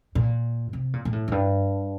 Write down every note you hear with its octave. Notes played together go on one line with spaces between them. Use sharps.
A#2
C3
A#2
A#2
A2
F#2
G2